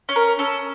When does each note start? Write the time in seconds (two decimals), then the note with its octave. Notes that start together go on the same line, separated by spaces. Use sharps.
0.09 C#4
0.16 A#4
0.39 C#4 A4